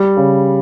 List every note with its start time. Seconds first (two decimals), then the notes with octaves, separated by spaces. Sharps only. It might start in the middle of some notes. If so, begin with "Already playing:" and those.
Already playing: G3
0.17 C#3